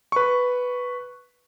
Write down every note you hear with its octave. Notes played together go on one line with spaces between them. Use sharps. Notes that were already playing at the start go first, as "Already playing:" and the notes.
B4 C#6